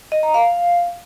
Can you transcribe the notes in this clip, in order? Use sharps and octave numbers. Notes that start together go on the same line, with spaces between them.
D#5
A#5
F5